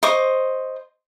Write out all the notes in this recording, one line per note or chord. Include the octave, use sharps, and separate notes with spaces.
C5 D#5 C#6 D6